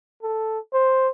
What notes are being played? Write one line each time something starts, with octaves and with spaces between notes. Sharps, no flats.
A4
C5